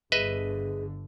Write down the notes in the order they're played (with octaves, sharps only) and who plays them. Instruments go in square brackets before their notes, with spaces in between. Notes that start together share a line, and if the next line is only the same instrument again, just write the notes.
[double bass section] G1 D3 [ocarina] G#4 [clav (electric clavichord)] B4 D#5 E5